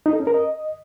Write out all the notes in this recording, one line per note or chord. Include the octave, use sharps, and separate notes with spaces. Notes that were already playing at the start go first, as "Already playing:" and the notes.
D#4
A4
C#4
A#4
D#5